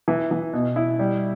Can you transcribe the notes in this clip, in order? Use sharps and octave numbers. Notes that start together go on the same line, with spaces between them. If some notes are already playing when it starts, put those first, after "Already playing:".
E3
E3
B2
E4
G3